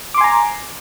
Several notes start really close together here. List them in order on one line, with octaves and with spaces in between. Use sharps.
D6 C6 G#5 A#5